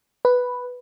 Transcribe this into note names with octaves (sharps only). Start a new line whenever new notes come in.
B4